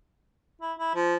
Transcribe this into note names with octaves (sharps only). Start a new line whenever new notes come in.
E4
E4
F3